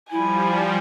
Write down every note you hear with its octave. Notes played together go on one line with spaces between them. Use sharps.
F3 G3 E4 G#5